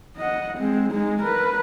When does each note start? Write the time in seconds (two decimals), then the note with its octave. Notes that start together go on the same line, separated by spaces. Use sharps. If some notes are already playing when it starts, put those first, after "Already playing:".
0.17 D#5 F#5
0.58 G#3 C4
0.92 G#3 D#4
1.22 A#4 B4